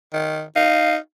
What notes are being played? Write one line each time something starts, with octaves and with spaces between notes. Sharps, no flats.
D#3
D#4 F5